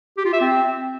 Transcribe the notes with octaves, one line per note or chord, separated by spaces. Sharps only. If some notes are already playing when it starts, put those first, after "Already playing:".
G4
F4
E5
C4